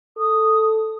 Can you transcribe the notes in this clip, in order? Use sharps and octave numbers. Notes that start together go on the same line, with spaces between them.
A4 D#6